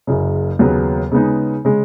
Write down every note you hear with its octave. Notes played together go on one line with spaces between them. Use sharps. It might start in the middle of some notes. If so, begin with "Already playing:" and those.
F#1 F#2 C#3
D#2 C#3 F#3 B3
C#3 G#3 B3 D#4
C#3 G#3